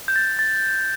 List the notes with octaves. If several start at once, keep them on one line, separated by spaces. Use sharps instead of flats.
G6
A6
A6